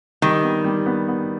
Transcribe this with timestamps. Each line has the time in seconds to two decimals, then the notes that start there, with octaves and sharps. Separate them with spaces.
0.22 D#3 G3
0.43 B3
0.64 G3
0.86 B3
1.08 B3